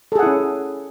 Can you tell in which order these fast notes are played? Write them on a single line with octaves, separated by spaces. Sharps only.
A4 G#4 F#5 E4 C#4